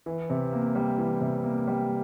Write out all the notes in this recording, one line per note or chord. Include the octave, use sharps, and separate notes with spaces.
E3
C3
A#3
G3
E3
C3
A#3
G3